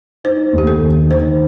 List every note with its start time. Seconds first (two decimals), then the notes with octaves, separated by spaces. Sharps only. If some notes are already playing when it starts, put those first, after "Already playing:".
0.24 D#4 C5
0.53 D#2
0.58 G4
0.67 A4
0.81 D#3
1.10 D#3 C5